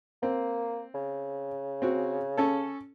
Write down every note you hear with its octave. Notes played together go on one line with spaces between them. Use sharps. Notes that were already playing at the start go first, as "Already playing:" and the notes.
A#3 C4
C#3
C4 F#4
C#4 A4